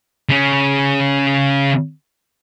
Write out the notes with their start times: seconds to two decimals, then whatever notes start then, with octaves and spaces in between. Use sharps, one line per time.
0.29 C#3 C#4